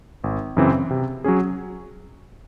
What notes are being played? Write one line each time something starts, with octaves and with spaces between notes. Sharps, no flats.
G#1
F#2 C#3 E3 C4
C3
F#3 C#4 G#4